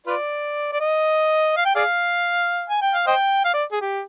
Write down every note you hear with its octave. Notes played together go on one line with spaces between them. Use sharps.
F4 B4 D5
D5
D#5
F5
G5
G#4 D5 F5
G#5
G5
F5
C5 D#5 G5
F5
D5
G#4
G4